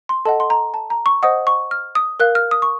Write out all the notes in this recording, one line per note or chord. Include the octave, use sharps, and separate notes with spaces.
C6
A4 D#5 F#5 A5
C6
A#5
A5
A#5
C#6
C5 D#5 F#5 D#6
C#6
F6
D#6
A#4 F5 F#6
F6
D#6
C#6